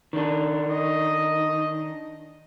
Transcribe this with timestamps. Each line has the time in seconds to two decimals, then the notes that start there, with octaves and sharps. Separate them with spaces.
0.13 D#3 D4
0.71 D#5